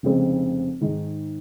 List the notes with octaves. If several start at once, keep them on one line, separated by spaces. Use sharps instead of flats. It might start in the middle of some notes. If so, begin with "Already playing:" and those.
F1 F2 C#3 G#3 C4
G#2 D#3 G#3 D#4